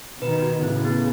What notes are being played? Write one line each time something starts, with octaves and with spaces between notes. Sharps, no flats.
B2 D#3 B4
F#4
A2 C#3 E4
B3